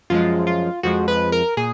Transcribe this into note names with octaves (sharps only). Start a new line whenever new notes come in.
F#2 F3 G#3 F4
F4
F2 F3 G#3 F#4
B4
A#4
A#2 G#4